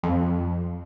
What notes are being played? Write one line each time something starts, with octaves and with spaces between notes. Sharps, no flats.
F2